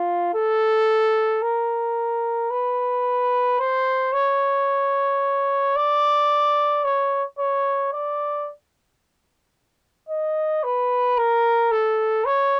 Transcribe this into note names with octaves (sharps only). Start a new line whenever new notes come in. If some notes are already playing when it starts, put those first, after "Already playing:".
Already playing: F4
A4
A#4
B4
C5
C#5
D5
C#5
C#5
D5
D#5
B4
A#4
A4
C#5